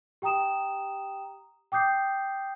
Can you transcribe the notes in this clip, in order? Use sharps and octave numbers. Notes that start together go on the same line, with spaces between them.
G4 G5 A#5 D#6 E7
G5 D6 D#6 G6 C7